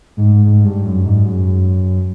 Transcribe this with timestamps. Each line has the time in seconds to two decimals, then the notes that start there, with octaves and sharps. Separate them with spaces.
0.17 G#2
0.45 G#2
0.64 G2
0.85 F#2
1.05 G#2
1.25 F#2